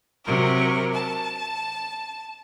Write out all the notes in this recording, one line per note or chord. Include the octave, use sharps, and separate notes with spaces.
C3 F#3 A#4
A5